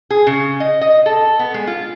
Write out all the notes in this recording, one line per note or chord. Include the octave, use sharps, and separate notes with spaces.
G#4
C#3
D#5
D#5
A4
B3
G#3
F4